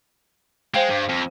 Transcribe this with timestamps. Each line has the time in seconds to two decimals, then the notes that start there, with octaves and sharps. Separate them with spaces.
0.74 G#3 C5 F5 G5
0.90 G2
1.09 F2